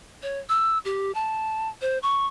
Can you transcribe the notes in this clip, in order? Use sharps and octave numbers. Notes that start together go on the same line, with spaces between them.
C#5
E6
G4
A5
C5
C#6